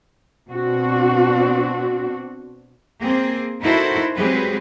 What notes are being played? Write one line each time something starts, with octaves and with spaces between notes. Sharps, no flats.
B2 C4 D4 F#4
A#3 C4 G#4
D#4 E4 F#4 A4 A#4 C5
F#3 G#3 C4 G4 G#4 B4